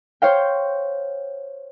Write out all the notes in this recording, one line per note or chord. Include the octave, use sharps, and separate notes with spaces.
C5 C#5 F5 G5